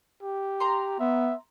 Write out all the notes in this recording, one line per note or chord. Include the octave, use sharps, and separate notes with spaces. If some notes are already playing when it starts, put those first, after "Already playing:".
G4
A#5 C6
B3 E5